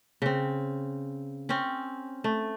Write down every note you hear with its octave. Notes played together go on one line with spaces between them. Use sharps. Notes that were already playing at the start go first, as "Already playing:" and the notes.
C#3 C4
C4 C#4
A3